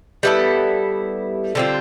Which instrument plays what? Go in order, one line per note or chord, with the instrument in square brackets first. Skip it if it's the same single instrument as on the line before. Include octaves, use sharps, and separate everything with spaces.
[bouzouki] G3 B3 E4 A4
D3 G3 C4 F4